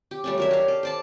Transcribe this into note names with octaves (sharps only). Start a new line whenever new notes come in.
G4
G3 A3 C#4
F#3 A#4 E5
G4 F5
A4
C5 D5 A5